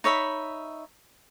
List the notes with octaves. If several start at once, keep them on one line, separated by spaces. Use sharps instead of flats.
D#4 C#5 E5 B5